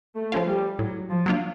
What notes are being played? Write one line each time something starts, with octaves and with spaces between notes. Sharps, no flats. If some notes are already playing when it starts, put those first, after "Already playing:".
A3
F3 A3 C#4 F4
G3
A2 F#3
F3
F#3 A#3 D4 F4